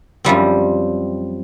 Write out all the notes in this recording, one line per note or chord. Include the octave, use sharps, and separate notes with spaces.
F#2 F3 G3 C4